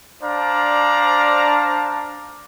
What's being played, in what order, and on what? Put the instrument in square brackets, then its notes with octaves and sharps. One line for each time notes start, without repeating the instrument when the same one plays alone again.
[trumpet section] D4 C5 D5 F5 A5 A#5